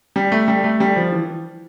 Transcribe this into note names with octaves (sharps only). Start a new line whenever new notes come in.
G3
A3
G3
A3
G3
F3
E3